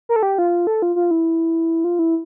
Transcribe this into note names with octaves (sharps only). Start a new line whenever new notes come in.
A#4
A4
G4
F4
A4
F4
F4
E4
F4
E4